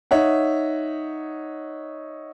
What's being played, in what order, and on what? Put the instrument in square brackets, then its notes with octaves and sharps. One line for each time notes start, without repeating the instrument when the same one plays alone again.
[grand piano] D#4 C#5 E5 F#5